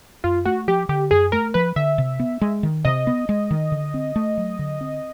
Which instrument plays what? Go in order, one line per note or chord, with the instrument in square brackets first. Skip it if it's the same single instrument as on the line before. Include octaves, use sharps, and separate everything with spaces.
[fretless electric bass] F#2 [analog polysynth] F4
[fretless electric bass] A3 [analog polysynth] F#4
[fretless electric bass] F3 [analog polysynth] G4
[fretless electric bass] D3 [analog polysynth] G4
[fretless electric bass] F#2 [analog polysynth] G#4
[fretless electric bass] A3 [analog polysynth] A#4
[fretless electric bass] F3 [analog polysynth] B4
[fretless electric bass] D3 [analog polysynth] E5
[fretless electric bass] C3
B3
G#3
D#3
[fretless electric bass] C3 [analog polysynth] D#5
[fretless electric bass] B3
G#3
D#3
D3
C4
A3
F#3
D3
C4